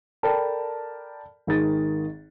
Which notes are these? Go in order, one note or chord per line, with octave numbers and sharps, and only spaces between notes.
A4 A#4 D5 G5 A5 B5
G#1 D#3 G#4 A6